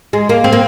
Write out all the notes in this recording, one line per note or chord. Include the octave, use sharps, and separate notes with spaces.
G#3
A#3
C4
A#3